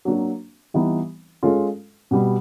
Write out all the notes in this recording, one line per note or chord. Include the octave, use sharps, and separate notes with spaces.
F#3 A#3 D4 F#4
E3 G3 B3 D#4 G4
G#3 C#4 F4 A4
B2 G3 B3